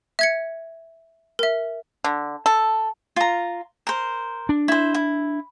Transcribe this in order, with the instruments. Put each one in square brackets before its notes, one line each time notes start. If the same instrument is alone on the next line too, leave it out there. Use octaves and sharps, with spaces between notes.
[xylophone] E5 G#6 C#7
A#4 E5
[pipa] D3
A4
[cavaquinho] F4 A#5
A#4 C5
[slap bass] D4
[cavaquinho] E4 C5
E4